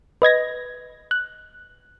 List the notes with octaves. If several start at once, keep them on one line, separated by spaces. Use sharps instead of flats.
B4 D#5 G#6 A#6
F#6